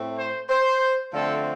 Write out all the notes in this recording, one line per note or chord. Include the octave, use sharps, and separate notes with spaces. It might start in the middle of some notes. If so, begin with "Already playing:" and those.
Already playing: A2 A3 C4
C5
C5
D3 F3 A3 C4 A4